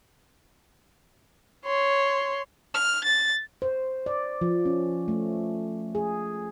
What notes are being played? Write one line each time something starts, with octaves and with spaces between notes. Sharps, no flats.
C#5 C6
F6
A6
C5
D5
F3
C#4
A3
G#4